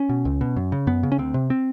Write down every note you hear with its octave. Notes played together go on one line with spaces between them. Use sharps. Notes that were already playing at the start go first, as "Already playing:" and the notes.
Already playing: C#4
B2
C#2
B2
F#2
C#3
F#2 B3
C#3
C#4
D2 C4
C3
C4